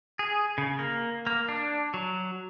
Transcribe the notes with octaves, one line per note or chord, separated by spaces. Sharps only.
G#4
C#3
A#3
A#3
D4
F#3